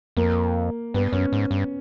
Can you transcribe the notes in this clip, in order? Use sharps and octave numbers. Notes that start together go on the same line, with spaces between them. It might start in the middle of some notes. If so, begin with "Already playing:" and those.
F2 A#3
G2 B3
F#2 C#4
G#2
G2